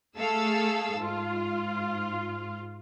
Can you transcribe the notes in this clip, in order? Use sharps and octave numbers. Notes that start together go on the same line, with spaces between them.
A3 G#4 A4 F5 E6
G#2 F4